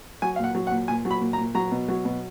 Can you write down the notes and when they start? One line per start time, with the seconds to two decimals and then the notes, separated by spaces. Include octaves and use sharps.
0.22 F#3 G#5
0.36 F5
0.39 A#2 F#5
0.55 F#3
0.67 F#5
0.71 A#2
0.88 A#2 G#5
1.05 F#3
1.11 B5
1.21 A#2
1.33 A#5
1.38 A#2
1.55 F#3 A#5
1.71 B2
1.89 F#3
2.05 B2